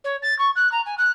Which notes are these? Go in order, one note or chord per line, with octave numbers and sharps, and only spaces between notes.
C#5
A6
C#6
F#6
A#5
G#5
F#6